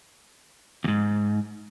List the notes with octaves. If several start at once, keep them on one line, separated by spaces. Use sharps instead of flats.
D#2 G#2